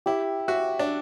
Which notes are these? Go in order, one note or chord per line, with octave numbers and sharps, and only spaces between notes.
E4 G4
F#4 E5
D4